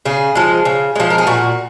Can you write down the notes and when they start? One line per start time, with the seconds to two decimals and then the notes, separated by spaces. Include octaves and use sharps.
0.05 C#3 G#4
0.35 F3 G#3
0.65 C#3
0.95 F3 G#3
1.10 A#4
1.18 G#4
1.27 A#2 F#4